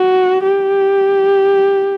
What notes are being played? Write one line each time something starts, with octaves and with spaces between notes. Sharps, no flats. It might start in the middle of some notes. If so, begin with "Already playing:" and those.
Already playing: F#4
G4